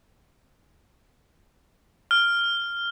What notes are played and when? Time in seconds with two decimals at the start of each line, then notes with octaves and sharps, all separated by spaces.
2.11 F6